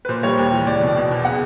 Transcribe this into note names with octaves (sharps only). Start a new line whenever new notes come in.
B4
A#2 C5
G3 C#5
D#2
E3
C#2 D5
B2
B2
E2
C#3 F#5